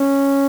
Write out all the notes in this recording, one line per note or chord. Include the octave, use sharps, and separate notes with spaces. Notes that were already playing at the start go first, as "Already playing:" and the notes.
Already playing: C#4